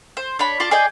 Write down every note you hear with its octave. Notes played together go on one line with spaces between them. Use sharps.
C5
D4 C#5 B5
F4 D5 A5
G#4 D5 D#5 G5